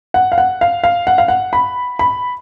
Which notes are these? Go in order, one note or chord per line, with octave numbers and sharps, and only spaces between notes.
F#5
F5
F#5
F5
F5
F#5
F5
F#5
B5
B5